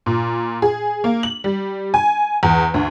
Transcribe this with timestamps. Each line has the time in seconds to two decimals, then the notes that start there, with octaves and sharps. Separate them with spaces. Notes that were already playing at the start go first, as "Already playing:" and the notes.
0.06 A#2
0.62 G#4
1.04 A#3
1.23 F#7
1.44 G3
1.94 G#5
2.43 E2
2.74 D2